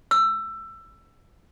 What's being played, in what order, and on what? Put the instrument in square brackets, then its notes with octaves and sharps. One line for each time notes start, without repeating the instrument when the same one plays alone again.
[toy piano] E6